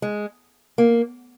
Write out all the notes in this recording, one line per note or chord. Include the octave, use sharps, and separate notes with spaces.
G#3
A#3